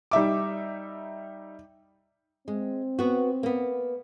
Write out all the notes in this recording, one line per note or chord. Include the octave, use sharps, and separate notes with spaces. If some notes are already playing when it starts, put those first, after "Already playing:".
G3 D#4 E5 D6
G#3 C4
B3 F#4
A#3 B3